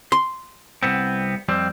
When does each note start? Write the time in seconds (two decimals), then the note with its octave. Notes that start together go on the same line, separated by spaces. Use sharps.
0.12 C6
0.83 C2 B3 C4
1.49 F2 G3 C4